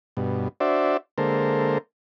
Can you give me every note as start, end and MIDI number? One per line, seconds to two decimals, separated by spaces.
0.17 0.48 43
0.17 0.48 47
0.60 0.97 62
0.60 0.97 66
0.60 0.97 72
0.60 0.97 74
0.60 0.97 76
1.18 1.78 50
1.18 1.78 56
1.18 1.78 58
1.18 1.78 69
1.18 1.78 70
1.18 1.78 72